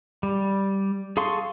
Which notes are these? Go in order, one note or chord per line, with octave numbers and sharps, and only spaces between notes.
G3
G#4 A4 F5 C6 C#6